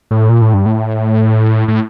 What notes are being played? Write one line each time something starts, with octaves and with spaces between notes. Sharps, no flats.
A2
A#2
A2
G2
A2
A2